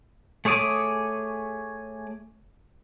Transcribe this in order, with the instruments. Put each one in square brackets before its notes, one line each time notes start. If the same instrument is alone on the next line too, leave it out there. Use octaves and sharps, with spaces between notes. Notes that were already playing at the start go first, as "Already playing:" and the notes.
[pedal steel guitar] A3 G#4 C#5 D6 D#6